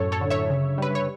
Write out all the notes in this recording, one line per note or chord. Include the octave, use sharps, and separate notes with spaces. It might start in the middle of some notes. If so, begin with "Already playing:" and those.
Already playing: F#2 A2 F#3 A4 C#5
A4 C#5
D3
C#5 E5
C#3
G3 B4
C#5